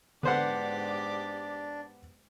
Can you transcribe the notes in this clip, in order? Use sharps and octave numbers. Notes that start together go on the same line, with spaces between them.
G#2 D3 B3 D4 G4 C5 D5 F#5